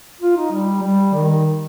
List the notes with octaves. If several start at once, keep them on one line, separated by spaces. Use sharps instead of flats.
F4
D#4
G3
G3
D#3